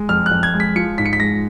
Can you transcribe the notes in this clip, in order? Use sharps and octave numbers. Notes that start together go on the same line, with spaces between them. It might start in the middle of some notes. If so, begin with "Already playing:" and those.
Already playing: G#3
F2 F6
F#6
F2
G#6
G#3
B6
F3 C#7
G#2 B6
C#7
B6
G#3 A#6